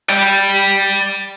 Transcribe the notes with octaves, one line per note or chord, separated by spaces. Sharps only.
D5 G5